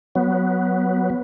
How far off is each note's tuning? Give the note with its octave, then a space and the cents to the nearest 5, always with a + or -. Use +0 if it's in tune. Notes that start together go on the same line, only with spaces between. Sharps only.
F#3 +0 B3 +0